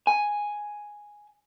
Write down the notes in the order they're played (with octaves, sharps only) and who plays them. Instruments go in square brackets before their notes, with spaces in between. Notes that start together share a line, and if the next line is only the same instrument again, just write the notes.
[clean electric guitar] G#5